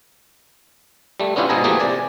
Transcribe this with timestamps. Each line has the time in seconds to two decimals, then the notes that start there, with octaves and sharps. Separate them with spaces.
1.20 G3 A3
1.36 B3 C#4 D4 E4 F4 G4
1.49 G#2 B2 B3 G#4 A#5
1.64 E3 F3 A3 A#3 G4 G#4
1.79 C3 D5 G#5